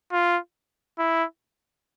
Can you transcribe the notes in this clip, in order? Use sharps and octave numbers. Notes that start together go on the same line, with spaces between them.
F4
E4